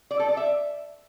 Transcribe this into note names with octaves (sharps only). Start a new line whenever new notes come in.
D5
A4
D5
E5